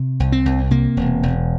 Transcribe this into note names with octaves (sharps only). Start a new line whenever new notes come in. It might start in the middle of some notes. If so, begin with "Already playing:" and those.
Already playing: C3
C2
C4
C2
C3 A#3
E1
E1